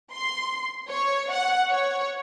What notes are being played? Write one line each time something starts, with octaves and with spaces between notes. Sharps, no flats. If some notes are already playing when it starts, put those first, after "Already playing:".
C6
C#5
F#5
C#5